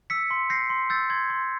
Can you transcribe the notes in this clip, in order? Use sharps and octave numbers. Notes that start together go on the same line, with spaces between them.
E6 B6 C#7
C6
G6 A#6 C7
C6
E6 G6 A6
C6 G#6
C6